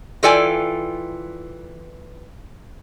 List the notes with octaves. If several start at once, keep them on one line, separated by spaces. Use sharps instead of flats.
E3 F4 A4 D5 G5 G#5